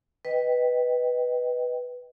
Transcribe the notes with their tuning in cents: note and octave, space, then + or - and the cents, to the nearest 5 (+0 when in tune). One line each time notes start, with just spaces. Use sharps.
B4 +0 D#5 +0 G5 +0